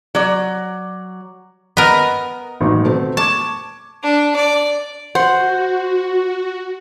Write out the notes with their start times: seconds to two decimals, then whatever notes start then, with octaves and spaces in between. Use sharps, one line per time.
0.15 F#3 D5
1.77 B3 A#4 D#5
2.61 A1 D#3 F#3
2.84 B2 A3 C4
3.17 A5 C#6 D6 G#6
4.03 D4
4.36 D5
5.15 F#4 C5 F#5